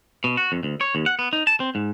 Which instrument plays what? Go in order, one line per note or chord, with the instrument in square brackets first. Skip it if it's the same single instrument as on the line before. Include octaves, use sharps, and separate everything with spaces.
[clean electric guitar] B2
F#4
F2
D2
C#5
D#2
F#5
B3
D#4
A5
C4
G#2